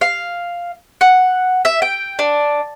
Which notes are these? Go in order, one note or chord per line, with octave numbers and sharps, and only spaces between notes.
F5
F#5
E5
G5
D4